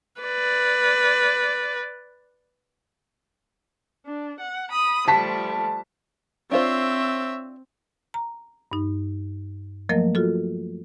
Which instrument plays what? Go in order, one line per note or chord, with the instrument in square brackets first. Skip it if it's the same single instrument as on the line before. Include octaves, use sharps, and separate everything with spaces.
[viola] B4 D5
[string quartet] D4
F#5
B5 D#6
[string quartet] F3 G3 A3 [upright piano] A5 B6
[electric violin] C4 [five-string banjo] D4 F4 C5 [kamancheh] C#5 E5
[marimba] A#5
G2 D#4
F3 F#3 A3 A#3 A#4 D#5
F4 F#4 A4